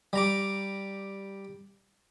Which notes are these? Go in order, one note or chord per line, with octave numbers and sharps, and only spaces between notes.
G3 A#5 D6